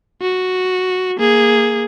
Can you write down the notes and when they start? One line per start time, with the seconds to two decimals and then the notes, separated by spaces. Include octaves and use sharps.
0.21 F#4
1.18 A#3 G#4